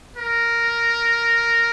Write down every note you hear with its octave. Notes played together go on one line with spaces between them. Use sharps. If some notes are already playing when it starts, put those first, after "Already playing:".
A#4